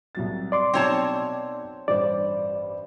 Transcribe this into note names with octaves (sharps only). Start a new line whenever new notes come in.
C2 F#3 A6
D5 C6 D6
B1 F#3 C4 C#5 G5 A5
A1 G2 C5 D5